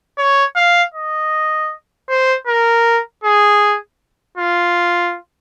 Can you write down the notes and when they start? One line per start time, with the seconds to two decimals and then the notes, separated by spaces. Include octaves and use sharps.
0.18 C#5
0.56 F5
0.94 D#5
2.09 C5
2.47 A#4
3.24 G#4
4.37 F4